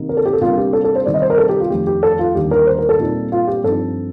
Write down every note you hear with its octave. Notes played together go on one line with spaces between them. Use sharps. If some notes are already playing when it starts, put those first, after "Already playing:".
Already playing: C3 D#3 A#3 D#4
A#4
A4
G4
A4
C3 G3 A#3 D4 F4
G4
A4
A4
C5
C3 D#3 G3 D5
D#5
C5
A#4
A4
G4
F4
F2 D#3 A3 G4
G4
A4
F4
D#2 D3 G3 G4
A#4
C5
A#4
A4
A#2 G3 C4 D#4
F4
G4
G2 F3 C4 D#4 A4